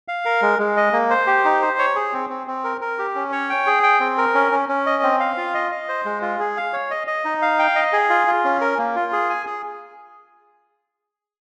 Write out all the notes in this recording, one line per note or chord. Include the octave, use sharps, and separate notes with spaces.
F5
A#4
G#3
G#3
D#5
A#3
C5
G4
D#4
C5
C#5
G#4
C4
C4
C4
A#4
A#4
G4
C#4
C#5
G5
G#4
G5
C4
A#4
C#4
C#4
C#4
D#5
C4
F5
F4
D#5
D#5
C5
G#3
F4
G#4
F5
C#5
D#5
D#5
D#4
F5
G5
D#5
G#4
F4
F4
C#4
A#4
A#3
F4
G#4
G#5
G#4